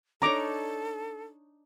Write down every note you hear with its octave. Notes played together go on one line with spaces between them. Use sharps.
D4 D#4 A4 C#5 A#5 D6